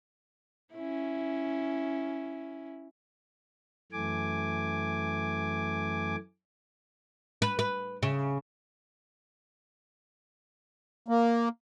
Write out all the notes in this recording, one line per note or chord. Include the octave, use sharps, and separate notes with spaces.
C#4 E4
F#2 E3 A3 G#5 D6
B4
B4
C#3
A#3